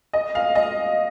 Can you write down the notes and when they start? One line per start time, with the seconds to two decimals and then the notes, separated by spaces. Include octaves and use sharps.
0.13 D#5
0.35 F5
0.55 D#5